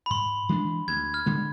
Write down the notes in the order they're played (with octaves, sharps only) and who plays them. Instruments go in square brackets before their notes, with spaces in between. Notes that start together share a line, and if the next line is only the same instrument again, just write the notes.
[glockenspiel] B5
[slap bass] G#2 [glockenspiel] C6
[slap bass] E3 G#3 D4
[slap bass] D2 [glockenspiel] G#6
[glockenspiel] F6
[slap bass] D3 G#3